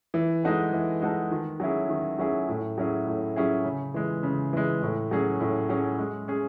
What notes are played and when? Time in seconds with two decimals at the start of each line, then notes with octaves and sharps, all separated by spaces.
0.14 E3
0.44 G#3 D#4 F#4 A4
0.73 E3
1.01 G#3 D#4 F#4 A4
1.31 D#3
1.60 F#3 C#4 E4 G#4
1.89 D#3
2.18 F#3 C#4 E4 G#4
2.48 A2
2.78 F#3 C#4 E4 G#4
3.07 A2
3.36 F#3 C#4 E4 G#4
3.65 C#3
3.94 E3 G#3
4.23 C#3
4.53 E3 G#3
4.82 A2
5.11 F#3 C#4 G#4
5.40 A2
5.69 F#3 C#4 G#4
5.99 G#3
6.28 C#4 G#4